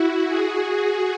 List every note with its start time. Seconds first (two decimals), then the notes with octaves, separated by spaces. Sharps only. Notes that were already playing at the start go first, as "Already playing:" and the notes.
Already playing: E4 F#4
0.27 F#4 G#4